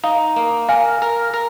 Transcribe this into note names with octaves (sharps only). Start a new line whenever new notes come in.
D#4 F5
A#3
A#4 F5 G#5
A#4
A#4